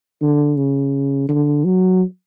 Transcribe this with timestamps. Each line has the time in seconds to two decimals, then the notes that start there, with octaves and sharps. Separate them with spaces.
0.21 D3
0.56 C#3
1.28 D3
1.64 F#3